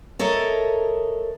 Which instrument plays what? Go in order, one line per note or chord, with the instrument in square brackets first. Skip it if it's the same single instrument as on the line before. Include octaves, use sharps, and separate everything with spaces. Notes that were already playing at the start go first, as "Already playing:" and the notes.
[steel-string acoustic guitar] A4 A#4 C#5 D#5 E5